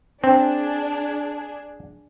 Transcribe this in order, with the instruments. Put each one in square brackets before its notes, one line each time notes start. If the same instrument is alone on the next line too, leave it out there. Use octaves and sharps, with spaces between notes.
[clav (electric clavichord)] C4 [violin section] D4 G#4